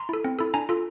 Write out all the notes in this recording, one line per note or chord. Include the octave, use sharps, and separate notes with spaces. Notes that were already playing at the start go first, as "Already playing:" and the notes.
Already playing: A#5 C6
E4 A4
C4
E4 A4
D4 G#5 A#5
F4 A4